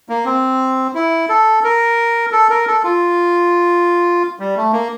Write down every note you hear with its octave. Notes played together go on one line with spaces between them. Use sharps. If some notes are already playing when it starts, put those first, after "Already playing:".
A#3
C4
E4
A4
A#4
A4
A#4
A4
F4
G3
A3
A#3